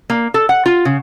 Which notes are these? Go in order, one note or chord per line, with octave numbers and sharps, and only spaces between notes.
A#3
A4
F#5
F4
C#3